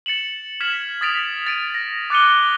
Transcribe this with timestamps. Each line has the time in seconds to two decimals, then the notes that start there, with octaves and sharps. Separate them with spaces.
0.06 A6 C#7 E7 F#7
0.60 F6 G#6 B6 E7 F#7
1.01 D#6 G#6 A6 B6 D7 F7
1.47 A6 D7 D#7
1.74 A#6
2.10 D6 F#6 A6 C#7 D#7 G7